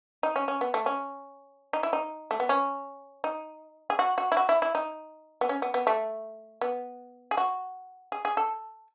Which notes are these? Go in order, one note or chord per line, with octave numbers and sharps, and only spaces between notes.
D#4
C#4
C#4
B3
A3
C#4
D#4
E4
D#4
A3
B3
C#4
D#4
G#4
F#4
F#4
E4
F#4
E4
E4
D#4
B3
C#4
B3
B3
A3
B3
G#4
F#4
G#4
G#4
A4